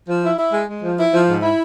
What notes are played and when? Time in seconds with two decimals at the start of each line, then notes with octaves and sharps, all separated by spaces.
0.08 F3
0.24 E4
0.39 E4
0.52 G#3
0.68 G#3
0.83 F3
0.98 E4
1.13 F3
1.29 G#2
1.43 E4